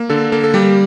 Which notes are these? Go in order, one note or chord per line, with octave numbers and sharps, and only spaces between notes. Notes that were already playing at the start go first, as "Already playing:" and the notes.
Already playing: A#3
D3 A4
A#3 A4
A4
G3 G4